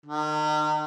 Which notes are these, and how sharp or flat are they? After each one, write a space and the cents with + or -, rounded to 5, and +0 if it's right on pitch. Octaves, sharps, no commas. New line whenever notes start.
D#3 -35